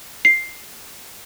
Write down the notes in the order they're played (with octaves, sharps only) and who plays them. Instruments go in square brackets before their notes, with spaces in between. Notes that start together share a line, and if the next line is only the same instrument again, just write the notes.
[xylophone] C7